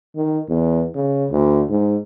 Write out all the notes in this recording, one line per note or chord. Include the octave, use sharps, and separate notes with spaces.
D#3
E2
C#3
D2
G#2